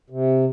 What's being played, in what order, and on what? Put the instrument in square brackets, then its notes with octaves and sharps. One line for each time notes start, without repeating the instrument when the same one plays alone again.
[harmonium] C3